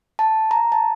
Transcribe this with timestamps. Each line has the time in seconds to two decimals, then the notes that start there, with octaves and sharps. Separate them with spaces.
0.19 A5
0.51 A#5
0.72 A5